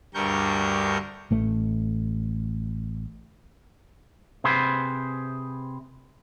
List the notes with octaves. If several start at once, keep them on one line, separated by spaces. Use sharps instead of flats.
D2 G2 G3 A#4 C#6 G6
A1 A3
C3 G#4 B4 C5